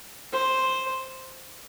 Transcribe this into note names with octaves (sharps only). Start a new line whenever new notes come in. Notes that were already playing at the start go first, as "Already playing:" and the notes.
C5